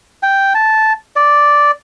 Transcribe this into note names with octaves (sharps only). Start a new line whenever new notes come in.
G5
A5
D5